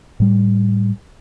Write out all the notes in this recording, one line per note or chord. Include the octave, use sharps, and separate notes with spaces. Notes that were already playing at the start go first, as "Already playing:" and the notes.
A2 G3